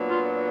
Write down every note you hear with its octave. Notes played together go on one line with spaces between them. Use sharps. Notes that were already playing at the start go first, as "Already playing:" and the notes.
Already playing: A#2 F#3 B3 D4
F4